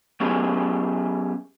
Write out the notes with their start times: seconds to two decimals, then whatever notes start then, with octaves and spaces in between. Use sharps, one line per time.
0.20 F#3 B3 C#4 G4 G#4